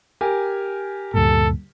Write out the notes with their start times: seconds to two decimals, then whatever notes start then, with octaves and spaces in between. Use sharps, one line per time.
0.21 G4 A#4 G#5
1.14 D2 G2 A#2 A4